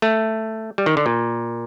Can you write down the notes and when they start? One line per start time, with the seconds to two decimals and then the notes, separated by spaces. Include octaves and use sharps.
0.02 A3
0.78 G3
0.86 D#3
0.97 D3
1.06 A#2